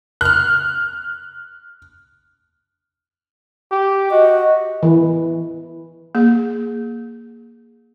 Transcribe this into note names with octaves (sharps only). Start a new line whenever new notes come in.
F6 F#6
G4
F#4 D#5
E3
A#3 G#4